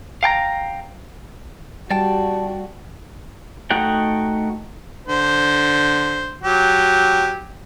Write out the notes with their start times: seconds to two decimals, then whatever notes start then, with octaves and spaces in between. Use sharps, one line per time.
0.23 F5 G5 A5 A#5
1.91 G3 F#4 D5 G5 A5
3.70 A3 D#4 F#4 F#5 G5
5.08 D3 C5
6.43 F#3 G4